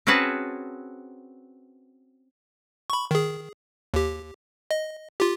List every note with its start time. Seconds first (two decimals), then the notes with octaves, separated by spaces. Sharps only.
0.07 C4 C#4 F#4 G#4 B4 A5
2.90 B5 C#6
3.11 D#3 G#4
3.94 D#2 G4
4.71 D#5
5.20 F4 G4